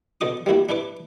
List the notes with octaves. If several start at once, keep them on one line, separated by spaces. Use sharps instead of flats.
B2 D3 F#4 D6 D#6
G3 A#3 E4 F#4
D4 E4 B4 D6